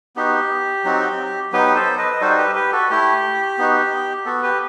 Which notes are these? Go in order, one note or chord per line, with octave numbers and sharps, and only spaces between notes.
B3 D#4 F#4 G4
F#3 C4 D#4 F#4
F#3 B3 D#4 G4 B4
A4 C5
B4 D#5
D#5
G3 D#4 F#4 A4 C5
G4 B4
G4 B4
F#4 A4
A3 E4 G4
B3 D#4 F#4
B3 F#4 A4
G4 B4